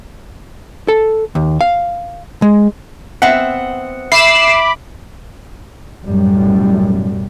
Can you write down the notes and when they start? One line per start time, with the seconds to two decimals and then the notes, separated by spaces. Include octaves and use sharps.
0.88 A4
1.35 D#2
1.61 F5
2.42 G#3
3.22 B3 C4 E5 F#5
4.12 E5 B5 D6 C7 E7
6.05 B1 F#2 A2 G3